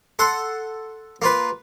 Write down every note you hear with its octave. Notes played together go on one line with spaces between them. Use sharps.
A4 F#5 C6
A#3 F4 B4